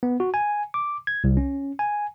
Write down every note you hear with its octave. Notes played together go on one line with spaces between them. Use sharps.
B3
F#4
G#5
D6
G#6
C2
C#4
G#5